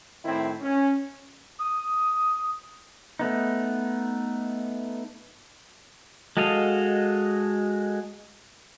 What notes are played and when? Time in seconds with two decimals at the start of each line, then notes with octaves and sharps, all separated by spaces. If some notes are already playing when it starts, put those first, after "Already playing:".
0.25 A2 D#3 C4 E4
0.61 C#4
1.59 D#6
3.19 A3 B3 D#4
6.37 G#3 F#4 A4 D#5 F5